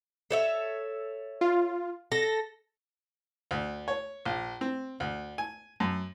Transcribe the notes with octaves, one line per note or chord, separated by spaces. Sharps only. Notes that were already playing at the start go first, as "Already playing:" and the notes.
A4 C#5 E5
F4
A4 A#6
D2
C#5
A#1
C4
D2
G#5
F#2